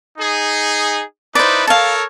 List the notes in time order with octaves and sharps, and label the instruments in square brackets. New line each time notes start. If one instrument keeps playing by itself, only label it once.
[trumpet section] D#4 G#4
[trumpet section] D#4 E4 B4 [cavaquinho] C5 D5
[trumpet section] A4 A#4 C#5 [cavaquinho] F5 A5